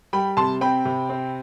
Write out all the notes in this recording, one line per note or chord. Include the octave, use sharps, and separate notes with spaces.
G3 G5 B5
C3 A5 C6
C4 G5 B5
C3
C4